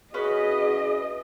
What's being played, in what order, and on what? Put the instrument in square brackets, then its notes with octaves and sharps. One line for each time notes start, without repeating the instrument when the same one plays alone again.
[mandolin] C#4 B4 [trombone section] E4 F#4 [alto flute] G#4 [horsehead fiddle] D#5